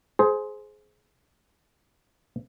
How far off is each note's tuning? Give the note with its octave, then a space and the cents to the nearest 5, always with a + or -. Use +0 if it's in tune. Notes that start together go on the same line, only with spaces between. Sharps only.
G#4 +20 C5 +0